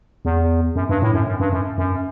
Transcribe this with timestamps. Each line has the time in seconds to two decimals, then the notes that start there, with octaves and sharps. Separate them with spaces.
0.25 E2
0.75 F#2
0.89 G2
1.02 A2
1.14 F#2
1.27 F#2
1.40 G2
1.52 F#2
1.78 F#2